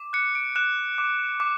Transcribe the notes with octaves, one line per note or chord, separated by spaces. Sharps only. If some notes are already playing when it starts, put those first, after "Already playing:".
Already playing: D6
F#6 C#7
D7
F#6 E7
D6
D6